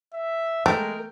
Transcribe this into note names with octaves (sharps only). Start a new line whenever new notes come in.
E5
G#3 A3 A#4 G5